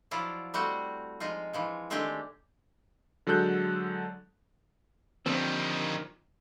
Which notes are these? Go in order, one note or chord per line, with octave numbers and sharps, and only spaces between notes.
F3 F#3 E4 F4 D5
G3 A3 C4 F#4 C5
F3 G#3 D#4 F4
E3 F3 G#3
D#3 G#3 A3 C4 D4 G4
D3 F#3 G#3 A4 F#6 G6
D3 D#3 F3 G3 C4